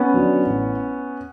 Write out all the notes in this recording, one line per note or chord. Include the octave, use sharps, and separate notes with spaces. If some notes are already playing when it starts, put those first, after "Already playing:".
Already playing: B3 C#4
D3 F#3
A1